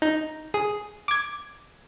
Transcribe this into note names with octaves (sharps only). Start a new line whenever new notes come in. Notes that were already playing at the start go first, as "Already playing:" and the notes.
D#4
G#4
D6 G#6